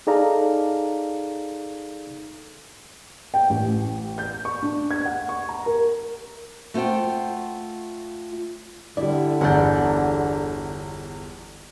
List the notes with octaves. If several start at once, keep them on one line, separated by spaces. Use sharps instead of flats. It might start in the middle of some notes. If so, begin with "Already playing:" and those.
D#4 G#4 A4 D5 F5 A#5
G5
A1
G6
C#6
D4
G#6
F#5
C#6
A#5
A#4
A3 F4 C5 F#5 G5
D3 G3 E4 D5
G1 E2 D5 F#5 G6